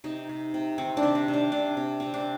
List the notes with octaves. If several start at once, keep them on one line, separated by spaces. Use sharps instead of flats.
C3 D#4
C3
C3
D#3 C4
D4
C3
C4
C3
D4
C3 D4
C3
C3 C4
D4